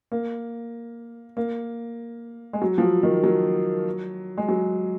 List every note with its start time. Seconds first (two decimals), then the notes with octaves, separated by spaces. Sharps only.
0.12 A#3
1.37 A#3
2.53 G#3
2.62 F#3
2.78 F3
2.82 F#3
3.03 D#3
3.24 F#3
4.38 G#3
4.49 F#3